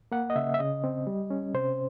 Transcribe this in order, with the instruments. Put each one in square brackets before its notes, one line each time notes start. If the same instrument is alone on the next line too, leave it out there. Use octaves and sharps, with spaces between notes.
[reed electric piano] A#3 F#5
D#5
C#3 E5
E5
C#3 D#5
C4
G3
C#4
C3 C5